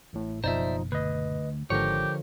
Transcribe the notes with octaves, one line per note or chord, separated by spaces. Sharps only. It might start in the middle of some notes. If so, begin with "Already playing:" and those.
A1 A2
F#1 B2 F3 D#4 C5 D5 E5
D2 B4 D#5
G#1 G#2 D3 F3 G4 A#4 C#5